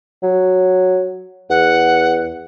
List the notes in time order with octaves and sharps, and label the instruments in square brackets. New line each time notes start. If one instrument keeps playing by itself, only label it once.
[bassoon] F#3
[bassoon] E2 [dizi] F#5